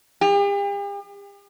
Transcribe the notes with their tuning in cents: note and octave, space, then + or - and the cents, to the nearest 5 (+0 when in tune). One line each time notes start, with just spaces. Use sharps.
G4 +45